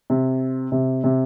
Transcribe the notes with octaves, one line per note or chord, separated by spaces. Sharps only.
C3
C3
C3